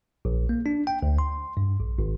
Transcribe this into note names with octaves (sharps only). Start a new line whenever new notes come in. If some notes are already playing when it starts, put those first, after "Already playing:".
A#1
A#3
D4
G5
D2
C6
G2
A#1
G#1